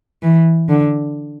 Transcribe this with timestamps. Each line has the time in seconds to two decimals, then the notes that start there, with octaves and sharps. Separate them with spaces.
0.23 E3
0.69 D3